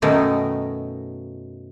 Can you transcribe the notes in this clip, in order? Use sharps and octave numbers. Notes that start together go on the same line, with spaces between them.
F#2 B2 D#3 A3 D#4 A#4